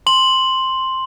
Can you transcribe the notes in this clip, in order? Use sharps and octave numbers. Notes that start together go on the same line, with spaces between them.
C6 F#7